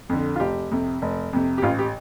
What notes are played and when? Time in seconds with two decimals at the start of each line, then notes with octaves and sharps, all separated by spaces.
0.09 F2 D3
0.36 F4
0.40 F1 G4
0.71 F2 C3
1.02 F1
1.33 F2 C3
1.58 G4
1.62 A1 F4
1.79 G4